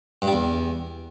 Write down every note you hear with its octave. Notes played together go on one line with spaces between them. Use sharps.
G2
G3
E2